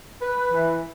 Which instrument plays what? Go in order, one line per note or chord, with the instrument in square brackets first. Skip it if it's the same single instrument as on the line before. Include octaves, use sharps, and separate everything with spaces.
[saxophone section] B4
E3